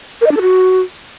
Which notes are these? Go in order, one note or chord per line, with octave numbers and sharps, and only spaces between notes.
A#4
D#5
D4
A4
F#4